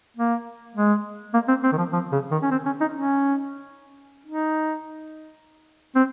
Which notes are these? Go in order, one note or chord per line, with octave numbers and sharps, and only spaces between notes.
A#3
G#3
A#3
C4
C4
D#3
F3
F3
C#3
D#3
C#4
C4
C#4
D#4
C#4
D#4
C4